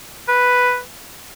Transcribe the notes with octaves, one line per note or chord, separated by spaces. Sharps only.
B4